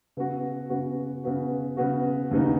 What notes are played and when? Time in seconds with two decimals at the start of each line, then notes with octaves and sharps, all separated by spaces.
0.17 C#3 B3 F#4
0.70 C#3 B3 F#4
1.24 C#3 B3 F#4
1.77 C#3 B3 F#4
2.31 D#2 C#3 B3 D#4